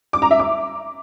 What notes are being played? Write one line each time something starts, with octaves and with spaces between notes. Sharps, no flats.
D6
A#5
E5
D6